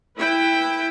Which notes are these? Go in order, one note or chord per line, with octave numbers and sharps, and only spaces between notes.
E4 B4 G5